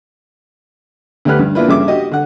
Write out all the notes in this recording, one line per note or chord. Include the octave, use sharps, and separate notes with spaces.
D2 A3 G4 B4 F6 F#6
G2
A#3 D4 E4 F4 B4
G2 C#3 A4 E5 D6
F#4 G4 D#5
D3 F#5